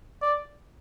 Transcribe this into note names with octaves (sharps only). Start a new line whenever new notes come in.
D5